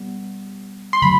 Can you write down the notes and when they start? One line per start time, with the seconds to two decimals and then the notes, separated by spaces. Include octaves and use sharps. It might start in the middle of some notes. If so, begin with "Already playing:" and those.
Already playing: G3 B3
0.93 C6
1.02 D3 F#3 A3 B5